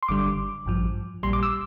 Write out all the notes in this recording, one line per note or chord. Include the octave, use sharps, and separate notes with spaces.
C6
G1 G2 D3 G3 D6
A1 G2 F3
A#1 A#2 G3 C6
D6
E6